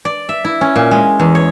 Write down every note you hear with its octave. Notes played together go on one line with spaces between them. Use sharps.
D5
E5
E4
C#4
A#2
G#3
E2
C#5